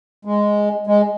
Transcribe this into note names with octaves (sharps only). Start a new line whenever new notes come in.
G#3
G#3